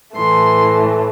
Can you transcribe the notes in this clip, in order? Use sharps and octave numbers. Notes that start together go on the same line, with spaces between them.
A2 E3 A3 C6